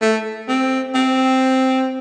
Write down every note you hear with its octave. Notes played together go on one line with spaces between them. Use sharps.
A3
C4
C4